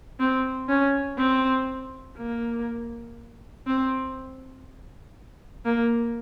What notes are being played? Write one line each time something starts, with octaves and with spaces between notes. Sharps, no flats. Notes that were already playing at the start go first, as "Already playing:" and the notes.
C4
C#4
C4
A#3
C4
A#3